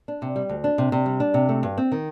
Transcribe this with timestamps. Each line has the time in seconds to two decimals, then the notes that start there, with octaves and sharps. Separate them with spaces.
0.08 D4
0.22 C3
0.36 G3
0.49 D2
0.64 D4
0.78 C3
0.92 C3
1.06 G3
1.20 D4
1.34 C3
1.49 A3
1.63 G2
1.78 C4
1.92 D#3